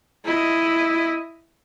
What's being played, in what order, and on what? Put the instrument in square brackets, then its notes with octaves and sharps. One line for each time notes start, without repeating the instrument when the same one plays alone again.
[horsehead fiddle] E4 D#5